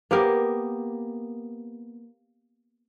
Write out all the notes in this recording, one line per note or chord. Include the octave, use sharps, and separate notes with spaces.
A#3 B3 G4 A#4